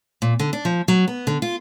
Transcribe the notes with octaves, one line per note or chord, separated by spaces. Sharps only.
A#2
D3
D4
F3
F#3
B3
D3
F4